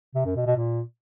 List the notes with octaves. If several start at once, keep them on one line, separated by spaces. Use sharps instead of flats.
C3
F#2
B2
B2
A#2